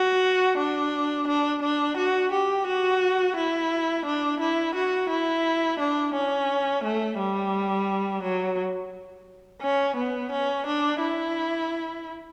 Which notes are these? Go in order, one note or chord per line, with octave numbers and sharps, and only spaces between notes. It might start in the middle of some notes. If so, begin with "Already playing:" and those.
Already playing: F#4
D4
D4
D4
F#4
G4
F#4
E4
D4
E4
F#4
E4
D4
C#4
A3
G3
F#3
C#4
B3
C#4
D4
E4